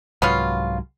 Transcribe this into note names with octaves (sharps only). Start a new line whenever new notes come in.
C2 G#2 F#3 B3 C#4 F4